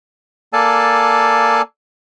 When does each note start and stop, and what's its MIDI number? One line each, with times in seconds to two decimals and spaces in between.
0.53 1.62 58
0.53 1.62 69
0.53 1.62 74
0.53 1.62 77
0.53 1.62 80
0.53 1.62 81